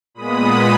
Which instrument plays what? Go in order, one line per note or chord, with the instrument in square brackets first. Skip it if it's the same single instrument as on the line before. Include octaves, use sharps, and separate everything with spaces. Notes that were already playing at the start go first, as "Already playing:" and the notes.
[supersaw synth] A#2 G#3 B3 B5 D#6